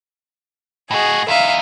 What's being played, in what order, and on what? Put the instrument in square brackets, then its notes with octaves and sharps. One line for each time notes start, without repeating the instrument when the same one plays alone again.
[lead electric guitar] A2 F#4 [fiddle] G#4 D#5
[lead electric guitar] E2 D#4 [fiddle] E5 F5